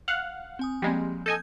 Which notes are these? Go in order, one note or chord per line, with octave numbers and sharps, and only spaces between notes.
F5 F#5 F#6
C4 G#5 D#6
F3 G3 G#3 A#3 C4
A4 D#5 G#5 G6 G#6